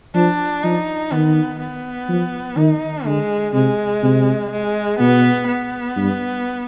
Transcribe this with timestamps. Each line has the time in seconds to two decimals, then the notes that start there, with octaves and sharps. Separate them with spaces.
0.15 F3 D4
0.64 F3 D#4
1.11 D#3 B3
1.60 B3
2.09 F3
2.57 D#3 D#4
3.05 D3 G#3
3.54 C3 G#3
4.03 C3
4.51 G#3
5.00 B2 B3
5.48 B3
5.97 G2